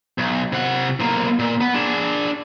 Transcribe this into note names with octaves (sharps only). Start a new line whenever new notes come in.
B1
C3 F#5
B1 A#3
A#2
B3
D4 G#4